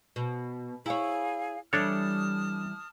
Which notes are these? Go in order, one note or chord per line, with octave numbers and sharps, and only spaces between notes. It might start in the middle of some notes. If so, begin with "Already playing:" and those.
B2
E4 G#4 C#5 F5
E3 G3 D4 A4 C#5 A5 D#6 F6